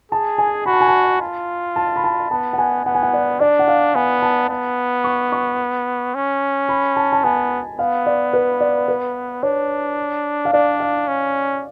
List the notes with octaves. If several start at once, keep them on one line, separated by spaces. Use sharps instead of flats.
G#4 A5
G#5
F#4 B5
A5
G#5
A5
F4
A5
B5
A5
B3 A5
F#5
G#5
B3 F#5
G#5
F#5
D5
D4 D5
F#5
F5
B3 G#5
A5
B3
C#6
C#6
C#4
B5
A5
A5
B3 G#5
B3 F5
D5
B4
D5
B4
D4 C#5
F5
D4 D5
F5
C#4